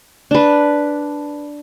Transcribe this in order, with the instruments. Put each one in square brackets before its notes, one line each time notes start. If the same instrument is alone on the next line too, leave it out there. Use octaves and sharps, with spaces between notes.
[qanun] D4 B4